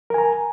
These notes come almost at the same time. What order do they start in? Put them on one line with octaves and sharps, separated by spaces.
A#4 G#5 A#5